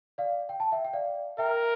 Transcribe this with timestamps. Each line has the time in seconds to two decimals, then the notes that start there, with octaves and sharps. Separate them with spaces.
0.18 D5 F5
0.49 G5
0.60 A5
0.72 E5 G5
0.85 G5
0.93 D5 F5
1.38 A#4 E5 G5